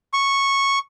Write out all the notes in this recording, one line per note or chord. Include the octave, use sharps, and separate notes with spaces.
C#6